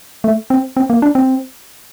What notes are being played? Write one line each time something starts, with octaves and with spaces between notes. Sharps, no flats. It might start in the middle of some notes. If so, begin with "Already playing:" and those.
A3
C4
C4
A#3
D4
C4